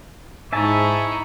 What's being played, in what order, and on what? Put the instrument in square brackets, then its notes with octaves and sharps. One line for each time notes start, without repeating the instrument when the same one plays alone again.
[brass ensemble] G#2 [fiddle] D#4 E4 [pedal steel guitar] E5 G#5 A5 [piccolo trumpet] C#6